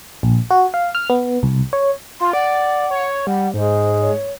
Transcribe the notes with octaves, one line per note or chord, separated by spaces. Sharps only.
A#1
F#4
F5
F6
B3
C2
C#5
F4 C6
D5 F#5
C#5
G3 F#5
G#2 G#3 C5
C#5